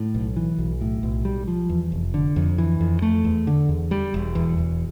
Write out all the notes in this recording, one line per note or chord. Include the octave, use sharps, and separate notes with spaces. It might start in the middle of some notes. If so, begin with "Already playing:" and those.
Already playing: A2
B1
E3
B1
A2
B1
G3
F3
E2
F1
D3
F2
E3
F2
A3
E2
D3
E2
G3
E1
E2
E1